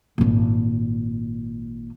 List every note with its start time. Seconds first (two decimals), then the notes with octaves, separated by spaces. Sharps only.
0.18 G#1 A#2